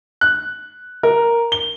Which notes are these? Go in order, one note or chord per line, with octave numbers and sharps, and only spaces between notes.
F#6
A#4
G7